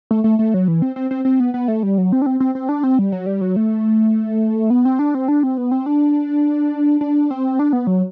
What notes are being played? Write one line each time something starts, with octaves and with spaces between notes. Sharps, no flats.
A3
A3
A3
F#3
E3
C4
C4
C4
C4
B3
B3
A3
G3
F#3
C4
D4
C4
C4
C4
D4
C4
G3
F#3
G3
F#3
A3
B3
C4
D4
C4
D4
C4
B3
C4
D4
D4
C4
D4
B3
F#3